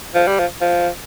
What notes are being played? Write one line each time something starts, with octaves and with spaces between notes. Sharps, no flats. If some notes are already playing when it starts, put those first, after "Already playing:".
F3
G3
F3
F3